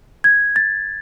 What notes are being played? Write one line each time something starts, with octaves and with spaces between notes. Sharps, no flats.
G#6
A6